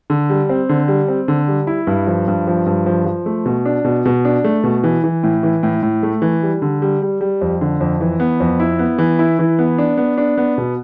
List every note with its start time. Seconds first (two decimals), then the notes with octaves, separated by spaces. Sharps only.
0.10 D3
0.30 G3
0.49 C4
0.69 D3
0.88 G3
1.08 C4
1.28 D3
1.48 G3
1.67 E4
1.87 G2
2.07 F3
2.28 G2
2.47 F3
2.66 G2
2.86 F3
3.06 F3
3.26 A3
3.46 B2
3.66 D4
3.84 B2
4.05 B2
4.25 D4
4.44 A3
4.64 B2
4.84 E3
5.04 E3
5.23 A2
5.43 E3
5.63 A2
5.82 A2
6.03 A3
6.22 E3
6.43 G3
6.62 D3
6.82 G3
7.02 G3
7.21 G3
7.41 F2
7.61 D3
7.81 F2
8.00 E3
8.20 B3
8.40 F2
8.60 E4
8.79 B3
8.98 E3
9.19 E4
9.39 E3
9.59 B3
9.78 D4
9.97 B3
10.18 D4
10.37 B3
10.58 B2